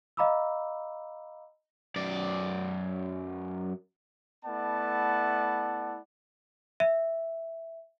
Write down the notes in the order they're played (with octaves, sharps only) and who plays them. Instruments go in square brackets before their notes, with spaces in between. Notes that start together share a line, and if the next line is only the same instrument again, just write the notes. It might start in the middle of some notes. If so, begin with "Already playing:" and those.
[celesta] D#5 F5 A#5 B5 D6 E6
[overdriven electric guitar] F#2 D5
[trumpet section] A3 B3 E4 D5 F#5 A5
[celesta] E5